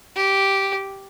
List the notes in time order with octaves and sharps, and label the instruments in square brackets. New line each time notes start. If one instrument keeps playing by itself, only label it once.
[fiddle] G4